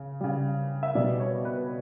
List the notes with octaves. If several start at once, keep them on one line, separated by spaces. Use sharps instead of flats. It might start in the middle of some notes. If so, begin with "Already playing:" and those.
Already playing: C#3
C#3 G3
E5
B2 G3 D5
C#5
B4